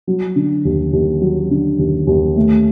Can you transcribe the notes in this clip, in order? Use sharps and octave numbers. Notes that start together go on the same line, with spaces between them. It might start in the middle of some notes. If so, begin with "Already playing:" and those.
F#3
D3
D#2
D#2
F#3
D3
D#2
D#2
A3